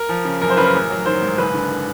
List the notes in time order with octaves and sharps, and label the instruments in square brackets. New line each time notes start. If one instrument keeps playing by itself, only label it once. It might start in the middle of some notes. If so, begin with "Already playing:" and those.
Already playing: [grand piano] A#4
F3
C#3
F#2 A#4
C5
C#3 B4
A#4
A1
F#3
D#3 C5
G#2
F#1 B4
D3